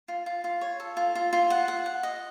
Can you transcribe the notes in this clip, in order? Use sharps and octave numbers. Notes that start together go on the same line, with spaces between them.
F4
F4
F4
C#5
A4
F4
F4
F4
F#5
F#5
F#5
D#5